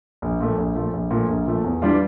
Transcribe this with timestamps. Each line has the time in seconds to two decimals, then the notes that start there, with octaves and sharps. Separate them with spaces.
0.22 A#1
0.41 A#2 F3 A3
0.58 A#1
0.75 A#2 F3 A3
0.93 A#1
1.11 A#2 F3 A3
1.29 A#1
1.46 A#2 F3 A3
1.64 E2
1.82 E3 G3 D4 F4